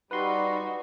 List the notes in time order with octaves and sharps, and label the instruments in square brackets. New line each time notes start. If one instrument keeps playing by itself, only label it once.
[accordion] G3 [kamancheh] D#4 F#4 [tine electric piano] B4 C6